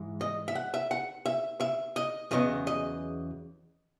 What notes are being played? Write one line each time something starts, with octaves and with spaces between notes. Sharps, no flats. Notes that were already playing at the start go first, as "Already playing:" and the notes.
Already playing: G#2 E3 G#3
D#5
E5
F#5
E5
F#5
E5
E5
D#5
E2 C#3 F#3 B3 D#5
D#5